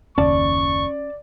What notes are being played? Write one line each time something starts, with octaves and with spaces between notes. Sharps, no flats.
F#1 D#2 C#4 D5 A5 C#6